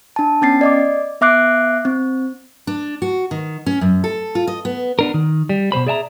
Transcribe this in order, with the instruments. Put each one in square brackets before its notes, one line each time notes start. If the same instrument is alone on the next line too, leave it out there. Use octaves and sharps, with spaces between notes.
[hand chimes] D4 A5
B3 C#4 A6 C7
D5 D#5 D6
B3 E5 D6 F#6 C7 D7
C4
[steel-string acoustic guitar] D4
F#4
D#3
C#4
F#2
A4
F4
D#5
B3
[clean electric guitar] B3 D4 A#4
D#3
G3
B2 E3 C5 B5
G#4 D5 E5 G#5 A#5